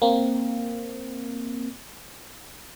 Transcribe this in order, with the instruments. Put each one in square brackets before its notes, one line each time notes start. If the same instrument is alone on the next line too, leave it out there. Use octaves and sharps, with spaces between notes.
[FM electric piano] A#3 C4